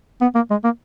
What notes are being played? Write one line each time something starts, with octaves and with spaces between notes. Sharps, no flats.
B3
A#3
G#3
A#3